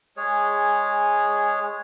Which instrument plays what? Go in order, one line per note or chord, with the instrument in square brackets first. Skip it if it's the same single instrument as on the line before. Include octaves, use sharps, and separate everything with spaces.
[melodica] G#3 G#4 C#5